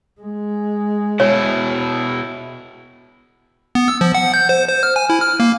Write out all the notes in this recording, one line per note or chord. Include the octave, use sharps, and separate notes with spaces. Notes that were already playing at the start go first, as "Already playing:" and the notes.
G#3
B2 E4 C#5
B3
E6
F3
F#5
G6
C5
C5
F6
G#5
E4
F6
A#3